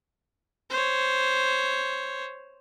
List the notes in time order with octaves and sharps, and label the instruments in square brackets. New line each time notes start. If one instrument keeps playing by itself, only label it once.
[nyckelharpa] C5 C#5